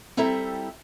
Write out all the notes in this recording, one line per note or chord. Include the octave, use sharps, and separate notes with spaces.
G3 C4 E4 A4 E5 A#5